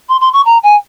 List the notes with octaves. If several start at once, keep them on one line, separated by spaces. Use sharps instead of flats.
C6
C6
C#6
A#5
G#5